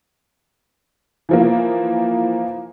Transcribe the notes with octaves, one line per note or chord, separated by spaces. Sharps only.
E3 F3 A#3